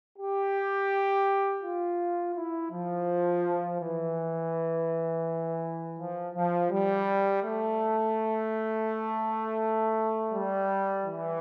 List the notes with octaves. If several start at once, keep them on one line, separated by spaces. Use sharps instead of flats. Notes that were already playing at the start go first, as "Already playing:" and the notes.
G4
F4
E4
F3
E3
F3
F3
G3
A3
G3
E3